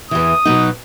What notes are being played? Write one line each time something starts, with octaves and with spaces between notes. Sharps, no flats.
E2 E3 D#6
B2 F#3 D#4